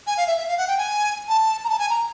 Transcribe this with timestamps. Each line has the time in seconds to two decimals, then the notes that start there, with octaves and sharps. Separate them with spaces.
0.07 G#5
0.17 F5
0.27 E5
0.38 E5
0.48 F5
0.58 F#5
0.68 G5
0.78 G#5
1.29 A5
1.64 A#5
1.70 A5
1.79 G#5
1.90 A#5